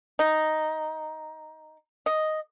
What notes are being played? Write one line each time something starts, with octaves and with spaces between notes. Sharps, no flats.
D#4
D#5